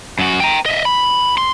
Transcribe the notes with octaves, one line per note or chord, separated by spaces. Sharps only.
F#2 F#4
G5 A#5
D#5 E5
B5
C6